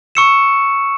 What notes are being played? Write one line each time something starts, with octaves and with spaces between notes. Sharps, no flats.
C#6 E6 C#7 E7